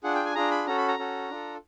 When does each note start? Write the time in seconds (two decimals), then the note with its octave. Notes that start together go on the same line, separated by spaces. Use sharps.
0.03 D4 F4 G#4 F#5
0.15 G5
0.25 G#5
0.35 D4 F4 G#4 A#5
0.51 B5
0.67 C#4 F#4 A4 A#5
0.78 B5
0.88 A#5
0.99 C#4 F#4 A4
1.30 D4 F4 A4